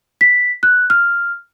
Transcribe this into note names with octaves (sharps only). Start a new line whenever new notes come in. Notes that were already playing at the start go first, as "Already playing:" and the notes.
B6
F#6
F6